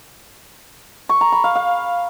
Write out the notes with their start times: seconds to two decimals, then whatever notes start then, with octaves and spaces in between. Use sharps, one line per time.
1.09 C#6
1.21 A#5
1.32 B5
1.44 F5
1.56 F5